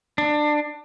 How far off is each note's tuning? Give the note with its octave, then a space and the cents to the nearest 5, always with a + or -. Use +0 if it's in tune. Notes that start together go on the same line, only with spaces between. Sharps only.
D4 +20